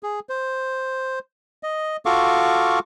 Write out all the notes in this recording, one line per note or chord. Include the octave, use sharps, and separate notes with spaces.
G#4
C5
D#5
F4 F#4 A4 F5 C#6 D6